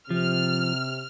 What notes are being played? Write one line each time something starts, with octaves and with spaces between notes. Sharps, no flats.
C3 F3 F6